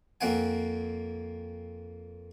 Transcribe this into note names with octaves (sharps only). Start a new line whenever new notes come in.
F2 A#3 C4 F#5 G#5